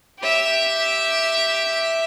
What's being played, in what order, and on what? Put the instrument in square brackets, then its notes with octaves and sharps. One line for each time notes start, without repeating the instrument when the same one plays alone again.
[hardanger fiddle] G4 E5